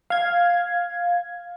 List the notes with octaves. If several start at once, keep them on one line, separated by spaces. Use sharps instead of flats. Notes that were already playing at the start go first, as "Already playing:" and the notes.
F5 G#6